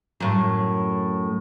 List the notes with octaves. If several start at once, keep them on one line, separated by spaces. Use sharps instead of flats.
F#2 A2